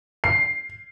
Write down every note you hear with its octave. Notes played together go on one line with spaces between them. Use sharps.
C7